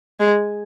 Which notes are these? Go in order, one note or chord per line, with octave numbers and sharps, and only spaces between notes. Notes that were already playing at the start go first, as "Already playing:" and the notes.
G#3